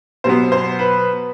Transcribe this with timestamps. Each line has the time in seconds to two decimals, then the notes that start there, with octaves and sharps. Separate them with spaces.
0.24 B2 F#3 B3 C5
0.52 C5
0.79 B4